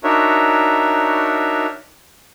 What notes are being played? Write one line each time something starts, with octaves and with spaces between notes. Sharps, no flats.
D4 D#4 F#4 A#4 C#5 E5